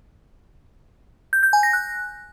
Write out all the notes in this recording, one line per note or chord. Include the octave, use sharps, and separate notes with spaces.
G6
G6
G#5
A#6
F#6